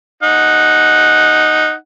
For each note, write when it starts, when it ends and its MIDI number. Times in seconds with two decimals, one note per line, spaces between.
0.23 1.73 63
0.23 1.73 78